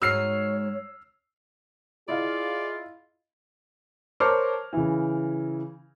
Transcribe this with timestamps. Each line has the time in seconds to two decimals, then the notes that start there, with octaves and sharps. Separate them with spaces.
0.02 G#2 G#3 F#4 C#5 E6 F6 C7
2.08 E4 F4 G#4 D5 D#5 F5
4.20 A#4 C5 C#5 A5 D6 F6
4.73 C#3 E3